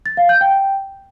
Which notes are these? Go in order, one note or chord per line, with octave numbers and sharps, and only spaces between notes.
A6
F5
G6
G5